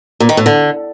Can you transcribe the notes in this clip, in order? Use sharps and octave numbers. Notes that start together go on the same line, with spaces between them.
A#2
D#3
A2
D3